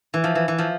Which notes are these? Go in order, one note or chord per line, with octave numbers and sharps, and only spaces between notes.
E3
F3
E3
E3
F3